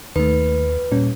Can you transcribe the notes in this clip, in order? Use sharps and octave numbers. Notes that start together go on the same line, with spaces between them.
D#2 D#3 A3 B4
A#2 G3 C#4